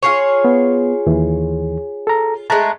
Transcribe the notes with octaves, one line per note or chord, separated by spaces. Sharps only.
F4 G#4 C#5
B3
D#2 E3
A4 A#5
G#3 A3 A5 A#5 F#6